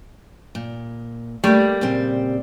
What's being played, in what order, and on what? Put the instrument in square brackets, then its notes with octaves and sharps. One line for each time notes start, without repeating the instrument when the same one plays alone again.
[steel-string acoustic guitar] A#2
[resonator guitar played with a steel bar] G3 [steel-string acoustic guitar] A3 A#3
[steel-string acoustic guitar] A#2 C#3 C4